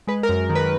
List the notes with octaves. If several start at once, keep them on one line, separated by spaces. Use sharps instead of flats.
G#3 B4
A#4
F#2
D#3
B4